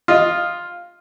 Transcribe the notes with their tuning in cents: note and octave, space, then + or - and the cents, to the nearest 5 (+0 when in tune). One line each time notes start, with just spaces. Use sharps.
F4 +5 D#5 +0